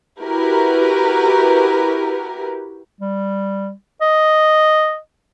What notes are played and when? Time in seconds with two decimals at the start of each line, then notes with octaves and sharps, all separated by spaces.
0.20 E4 F#4 G4 A#4 B4
3.01 G3
4.01 D#5